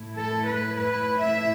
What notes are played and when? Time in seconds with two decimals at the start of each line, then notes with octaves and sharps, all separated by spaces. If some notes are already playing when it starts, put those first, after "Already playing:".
Already playing: A2 A3 E4
0.17 A4
0.47 B4
0.76 B4
1.20 E5